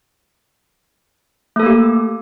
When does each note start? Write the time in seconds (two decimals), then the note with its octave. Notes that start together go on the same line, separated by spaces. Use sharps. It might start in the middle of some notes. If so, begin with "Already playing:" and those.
1.56 A3
1.59 A4
1.63 A#3
1.66 G4